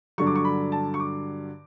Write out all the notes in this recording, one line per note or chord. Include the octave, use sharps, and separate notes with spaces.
G2 D3 F#3 C#6
D6
C#6
B5
A5
C#6
D6